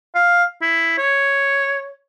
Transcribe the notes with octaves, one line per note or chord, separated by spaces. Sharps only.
F5
E4
C#5